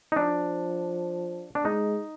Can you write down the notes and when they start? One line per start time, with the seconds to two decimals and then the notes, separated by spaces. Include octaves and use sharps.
0.12 D#4
0.16 F3 D4
1.55 D4
1.64 G#3 D#4